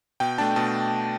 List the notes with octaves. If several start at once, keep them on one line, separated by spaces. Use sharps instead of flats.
B2 G5
A3 D4 A5
B2 A5